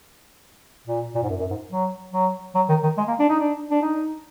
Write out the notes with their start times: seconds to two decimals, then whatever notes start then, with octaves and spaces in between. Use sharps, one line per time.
0.87 A#2
1.15 A#2
1.23 G#2
1.30 F#2
1.40 F#2
1.51 G#2
1.72 F#3
2.13 F#3
2.55 F#3
2.69 D#3
2.84 D#3
2.98 G#3
3.08 A#3
3.19 D4
3.30 D#4
3.40 D4
3.71 D4
3.82 D#4